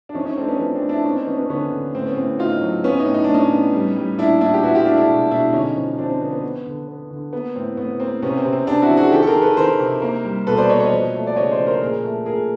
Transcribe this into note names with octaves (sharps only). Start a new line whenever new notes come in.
D4
F3 C#4 D#4
C#4 D#4
A3 C4 D4
B3 C#4
F3 B3 C#4
C4 D4
A3
D4 E4
A#3 C#4 D#4
C4 D4
F3 B3 C#4
B3 C#4
D3 B3 C#4
D3
A2 C4
B3 C#4
A2 C4
A2 D#4 F4
F#3
B3 C#4
C#4 D#4
A2
D#4
A2 D4
C#4 D#4
B3
G3
G3
A#2 D4 E4
A#2 D4 E4
G4
B3 E4 F#4
F4 G4
G#3 D4 E4
D4 E4
B2
B2 D4 E4
D3 C#4 D#4
F3
F3 C4 D4
C4
D3 B3
B3
B3
D3
B3
D3
A#3 B3
A2 C4
A2 B3
A#3 C4
C3 B3 C#4
C4
C3
C4
C3 C4 D4
E4 F#4
F3
F#4 G#4
D#3 G4 A4
A4
G#4 A#4
D#3
A4 B4
D#3 A#4 C5
C3
A#3
G3
B2 A4 B4
C5 D5
A#3 C#5 D#5
C#5 D#5
F3
A3
D5
C#3 C#5 D#5
C5 D5
F3
A#4 C5
A#2 G#4 A#4
A3
A#2 G#4 A#4